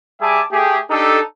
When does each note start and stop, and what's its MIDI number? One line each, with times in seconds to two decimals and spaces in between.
0.21 0.41 55
0.21 0.41 68
0.21 0.41 76
0.21 0.41 80
0.21 0.41 81
0.21 0.41 86
0.51 0.78 57
0.51 0.78 67
0.51 0.78 68
0.89 1.19 62
0.89 1.19 63
0.89 1.19 67
0.89 1.19 69